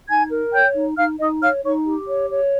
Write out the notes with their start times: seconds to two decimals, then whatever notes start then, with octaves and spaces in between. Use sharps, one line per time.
0.09 D#4 G#5 G#6
0.30 A#4
0.52 C#5 G5 G6
0.75 D#4
0.97 D#4 F5 F6
1.19 D#4 D#5 D#6
1.41 C#5 F5 F6
1.63 D#4 C#5 C#6
1.85 G4
2.07 C#5
2.29 C#5